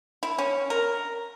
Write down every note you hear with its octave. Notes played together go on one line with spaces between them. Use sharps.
E4
C#4
A#4